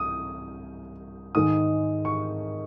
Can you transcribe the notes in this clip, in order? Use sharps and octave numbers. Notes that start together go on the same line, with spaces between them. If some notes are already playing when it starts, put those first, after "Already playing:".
Already playing: C2 D#6
G#2 D#3 G#3 D#6
C#6